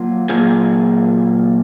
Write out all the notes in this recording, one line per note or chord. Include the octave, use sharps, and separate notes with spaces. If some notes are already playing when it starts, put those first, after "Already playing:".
Already playing: F#3 A#3 F4
A#2 F#3 A#3 F4 G#4